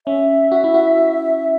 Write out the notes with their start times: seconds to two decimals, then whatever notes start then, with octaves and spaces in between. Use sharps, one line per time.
0.06 C#4 E5
0.52 F#4
0.64 E4
0.74 F#4